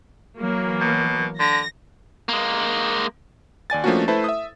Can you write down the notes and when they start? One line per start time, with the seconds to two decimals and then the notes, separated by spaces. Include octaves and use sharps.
0.40 E3 F#3 A#3
0.80 B2
1.39 D3 A#6
2.29 G#3 A#3
3.70 D#2 D5 G#5 A6
3.84 F3 A3 A#3 C#4 D4 F#4
4.08 A3 E4 A4 B4 C5 A5
4.24 E5 D#6